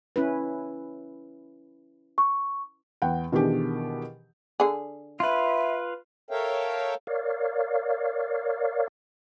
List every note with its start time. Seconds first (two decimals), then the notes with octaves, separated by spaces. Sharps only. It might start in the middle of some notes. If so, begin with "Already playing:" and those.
0.16 C#4 E4 B4
2.18 C#6
3.02 E2 F#5 G5
3.32 B2 D#3 E3 D4 G4 G#4
4.60 D3 G#4
5.20 F4 B4 E5
6.31 A4 A#4 C#5 E5 F5 G5
7.07 A#4 C#5 D5 F5